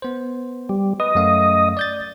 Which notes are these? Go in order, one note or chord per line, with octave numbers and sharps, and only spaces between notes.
B3 C5
G3
B4 D#5
F#2 A3 F5
D5 G6 A6